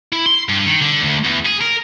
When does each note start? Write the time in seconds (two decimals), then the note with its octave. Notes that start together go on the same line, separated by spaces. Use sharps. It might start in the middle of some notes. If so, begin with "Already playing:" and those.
0.12 E4
0.26 C6
0.49 G2
0.66 D#3
0.81 D3
1.01 D2
1.24 E2
1.45 G#4
1.61 A#4